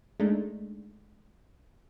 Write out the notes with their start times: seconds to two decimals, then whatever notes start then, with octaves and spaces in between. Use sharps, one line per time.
0.20 G#3 A3 D4 D#4